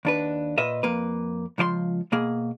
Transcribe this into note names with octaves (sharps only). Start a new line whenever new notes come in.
D#2 D4 B4
A#2 B4 D#5 E5
F2 A#3 B4
C#2 F3 D5 C6
B2 A#3 G#4